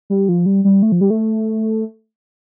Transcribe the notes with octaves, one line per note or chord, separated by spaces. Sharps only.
G3
F3
G3
G3
A3
F3
G3
A3